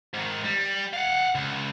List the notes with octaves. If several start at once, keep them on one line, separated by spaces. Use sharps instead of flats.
G#2 D#3
G3
F5 F#5
C#2